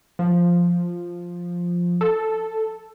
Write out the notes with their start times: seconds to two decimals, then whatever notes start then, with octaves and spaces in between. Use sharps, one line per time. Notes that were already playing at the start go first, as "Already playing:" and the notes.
0.19 F3
2.01 A4